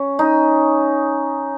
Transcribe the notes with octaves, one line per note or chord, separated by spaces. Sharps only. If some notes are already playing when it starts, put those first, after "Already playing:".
Already playing: C#4
D#4